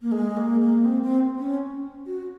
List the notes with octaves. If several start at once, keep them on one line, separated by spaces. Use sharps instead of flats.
A#3
G#3
A#3
A#3
C4
C4
C#4
F#4